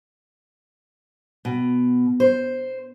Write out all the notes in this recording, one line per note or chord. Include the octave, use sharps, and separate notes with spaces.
B2
C5